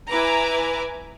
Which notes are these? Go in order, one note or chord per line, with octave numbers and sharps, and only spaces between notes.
E4 B4 G#5 A#5 D6